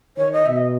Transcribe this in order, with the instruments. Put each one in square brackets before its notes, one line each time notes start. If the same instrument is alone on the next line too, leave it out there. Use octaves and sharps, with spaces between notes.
[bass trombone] D#3 [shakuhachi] C#5
[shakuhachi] D#5
[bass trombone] B2 [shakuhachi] E5
[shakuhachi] D#5